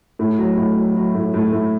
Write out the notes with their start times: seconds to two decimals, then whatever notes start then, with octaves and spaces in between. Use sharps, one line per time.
0.19 A2
0.38 F#3
0.57 A2
0.77 F#3
0.95 F#3
1.15 A2
1.34 A2
1.52 A2